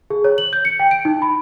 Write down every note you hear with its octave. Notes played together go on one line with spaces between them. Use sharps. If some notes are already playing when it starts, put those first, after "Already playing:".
G#4
C#5
F#7
G6
C#7
G5
D7
D#4
B5